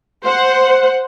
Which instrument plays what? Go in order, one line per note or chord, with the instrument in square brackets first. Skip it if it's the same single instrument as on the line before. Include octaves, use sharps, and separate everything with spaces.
[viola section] C5 F#5